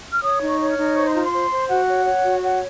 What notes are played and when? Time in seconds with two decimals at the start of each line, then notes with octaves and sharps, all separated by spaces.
0.13 F6
0.22 C#5 D#6
0.41 D#4
0.47 C#6
0.59 C#5
0.71 F6
0.78 D#4
0.95 C5 C#6
1.05 C6
1.14 F4 A#5
1.22 C6
1.33 C5
1.50 C5
1.69 F#4 F#5
1.87 C#5
2.06 C#5
2.24 F#4
2.42 C#5 F#5